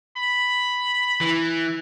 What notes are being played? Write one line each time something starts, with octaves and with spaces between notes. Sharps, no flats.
B5
E3